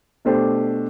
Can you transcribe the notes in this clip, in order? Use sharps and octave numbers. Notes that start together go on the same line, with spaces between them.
B2 A3 D4 G4 C5